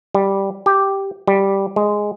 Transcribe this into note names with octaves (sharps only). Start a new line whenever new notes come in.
G3
G4
G3
G#3